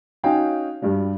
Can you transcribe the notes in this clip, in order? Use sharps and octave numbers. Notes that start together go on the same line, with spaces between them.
C#4 D#4 F#4 F5 G5 G#5
G2 G3 D4 F#4